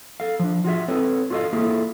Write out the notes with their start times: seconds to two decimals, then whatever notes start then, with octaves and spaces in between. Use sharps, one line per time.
0.20 A4 F5
0.39 F3 D4
0.64 F4 F#4 G#4 E5
0.88 C4 A4 B4 C#5
1.30 F4 F#4 A4 C#5 D#5 F5
1.52 A#3 E4 F4 G#4 A4